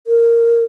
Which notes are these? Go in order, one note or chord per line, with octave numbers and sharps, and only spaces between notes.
A#4